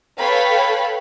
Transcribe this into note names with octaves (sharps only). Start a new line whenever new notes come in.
A4 B4 C#5 F5 G5 B5